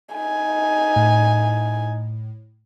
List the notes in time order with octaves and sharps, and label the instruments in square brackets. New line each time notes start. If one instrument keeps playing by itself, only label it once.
[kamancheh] D#4 G#5
[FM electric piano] A2